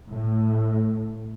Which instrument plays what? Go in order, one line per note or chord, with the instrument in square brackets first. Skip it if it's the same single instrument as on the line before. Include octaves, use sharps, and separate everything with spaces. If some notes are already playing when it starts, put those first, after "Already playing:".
[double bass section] A2